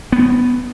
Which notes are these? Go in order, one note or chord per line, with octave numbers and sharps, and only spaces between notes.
B3